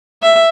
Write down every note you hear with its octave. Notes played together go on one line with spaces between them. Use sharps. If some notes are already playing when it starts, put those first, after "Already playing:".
E5